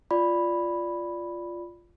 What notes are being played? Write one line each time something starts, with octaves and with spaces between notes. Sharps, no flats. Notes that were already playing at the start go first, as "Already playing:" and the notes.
F4 D5 B5